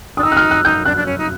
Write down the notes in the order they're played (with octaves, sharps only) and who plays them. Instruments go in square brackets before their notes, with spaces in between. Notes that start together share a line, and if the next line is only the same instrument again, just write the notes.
[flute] D4 [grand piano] D#6
[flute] D#4 [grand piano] E6
[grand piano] F#6
F6
F#6
[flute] D#4 [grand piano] G6
[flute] D4 [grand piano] F#6
[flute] D4
C#4
D#4